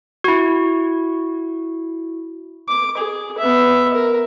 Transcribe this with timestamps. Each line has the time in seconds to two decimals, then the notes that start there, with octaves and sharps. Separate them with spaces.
0.24 E4 F#4
2.68 D6
2.97 G#4
3.38 B3 E5
3.94 A#4